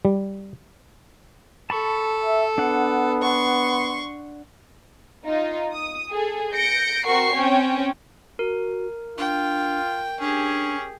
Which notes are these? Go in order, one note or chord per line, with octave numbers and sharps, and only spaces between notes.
G3
A4 A5 B5 C#6
E5
B3 D4 F#5
C6 C#6
D#4 F4
D#6
G#4 A4
G6 A#6 C#7 D7
C4 F#4 A#4 F#5 C#6 C7
C4 C#4 C#5 G5
F#4 A#4
D4 F4 G5
C#4 D4 G4 G#4